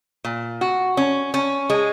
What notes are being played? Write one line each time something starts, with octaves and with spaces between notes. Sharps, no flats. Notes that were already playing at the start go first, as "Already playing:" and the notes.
A#2
F#4
C#4
C#4
G#3